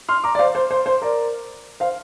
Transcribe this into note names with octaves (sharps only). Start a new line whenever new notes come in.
C6 F6
A#5 D6
D5
C5 F5
C5
C5
C5
A#4 D5
C5 F5